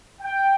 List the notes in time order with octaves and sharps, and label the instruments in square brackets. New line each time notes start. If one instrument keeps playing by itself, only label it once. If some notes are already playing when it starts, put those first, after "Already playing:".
[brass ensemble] G5